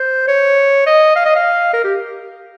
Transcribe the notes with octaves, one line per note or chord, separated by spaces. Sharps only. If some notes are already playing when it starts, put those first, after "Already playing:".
Already playing: C5
C#5
D#5
F5
D#5
F5
A#4
G4